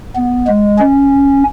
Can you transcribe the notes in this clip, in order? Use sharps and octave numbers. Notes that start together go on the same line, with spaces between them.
B3
G#3
C#4